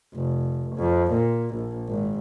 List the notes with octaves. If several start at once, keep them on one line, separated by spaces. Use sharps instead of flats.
F1
F2
A#2
A#1
G#1